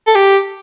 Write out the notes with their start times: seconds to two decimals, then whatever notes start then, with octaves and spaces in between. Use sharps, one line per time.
0.07 A4
0.15 G4